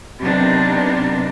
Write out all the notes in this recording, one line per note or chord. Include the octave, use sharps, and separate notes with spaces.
C3 F#3 B3 D4 D#4 A#4